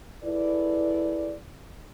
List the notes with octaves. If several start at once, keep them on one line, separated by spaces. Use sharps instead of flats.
E4 G#4 A4 B4 D5